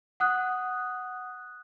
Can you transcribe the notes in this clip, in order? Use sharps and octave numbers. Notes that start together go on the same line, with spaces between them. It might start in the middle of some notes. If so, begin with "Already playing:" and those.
F#5 D#6 F#6